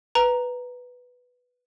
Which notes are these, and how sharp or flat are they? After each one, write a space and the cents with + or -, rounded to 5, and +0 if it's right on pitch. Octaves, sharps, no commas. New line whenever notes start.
B4 +0 A#5 +0